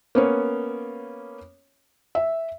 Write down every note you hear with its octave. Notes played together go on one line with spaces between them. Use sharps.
A#3 B3 C#4 C#5
E5